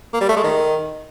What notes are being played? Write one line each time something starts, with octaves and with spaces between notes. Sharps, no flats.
A#3
G3
A3
G#3
D#3